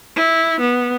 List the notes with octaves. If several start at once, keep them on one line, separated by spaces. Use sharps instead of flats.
E4
B3